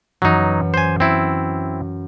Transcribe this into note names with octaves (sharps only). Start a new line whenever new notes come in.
F#2 E3 F#3 D#4
C5 G#5
C4 E4